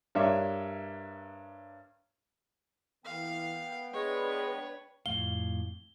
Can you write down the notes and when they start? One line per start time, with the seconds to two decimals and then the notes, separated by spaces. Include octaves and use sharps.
0.15 G2 D4 A#4 C#5 E5 D6
3.05 E3 B3 F5 G5
3.93 G#3 D4 B4 C#5
5.06 F2 A2 F5 G7